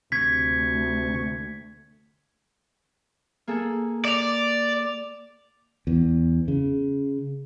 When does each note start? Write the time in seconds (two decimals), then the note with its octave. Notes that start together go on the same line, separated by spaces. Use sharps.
0.12 D2 C3 C#6 G#6 B6
3.47 A#3 G#4 A4
4.05 D5 D6 F7
5.87 E2
6.48 C#3